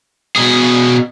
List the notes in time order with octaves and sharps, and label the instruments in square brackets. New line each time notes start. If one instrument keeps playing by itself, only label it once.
[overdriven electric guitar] B2 G#4